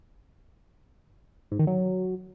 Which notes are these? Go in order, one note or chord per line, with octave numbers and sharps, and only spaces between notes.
G#2
D#3
F#3